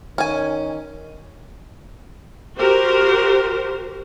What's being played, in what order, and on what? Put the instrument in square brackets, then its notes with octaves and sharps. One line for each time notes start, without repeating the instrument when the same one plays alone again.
[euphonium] D#3 [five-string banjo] C#4 G#5
[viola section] F#4 G4 A#4 C5